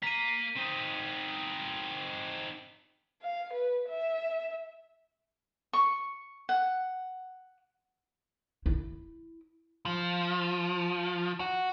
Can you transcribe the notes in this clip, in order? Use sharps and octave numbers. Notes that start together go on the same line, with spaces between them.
A#3 A#5 B6 D#7
C4 D#4
F5
B4
E5
C#6
F#5
E4
F3
F#4